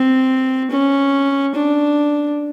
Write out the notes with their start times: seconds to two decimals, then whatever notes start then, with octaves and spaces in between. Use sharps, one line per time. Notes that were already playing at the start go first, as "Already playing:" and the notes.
Already playing: C4
0.71 C#4
1.54 D4